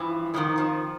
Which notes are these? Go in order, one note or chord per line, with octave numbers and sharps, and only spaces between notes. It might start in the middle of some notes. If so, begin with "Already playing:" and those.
Already playing: G2 E3 F3
F2 C3 D#3 F3
F3